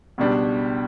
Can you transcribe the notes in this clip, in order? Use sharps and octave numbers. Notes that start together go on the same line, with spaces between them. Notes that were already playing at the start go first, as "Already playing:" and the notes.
C#2 B2 G3 D4